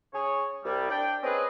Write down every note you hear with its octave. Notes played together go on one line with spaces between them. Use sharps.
C#3 G#4 C#5
C2 G3
D4 D5 G5
C4 C#4 G#4 B4 D#5